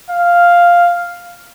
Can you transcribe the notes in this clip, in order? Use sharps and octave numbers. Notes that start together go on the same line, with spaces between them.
F5